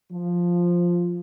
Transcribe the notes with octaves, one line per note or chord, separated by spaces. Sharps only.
F3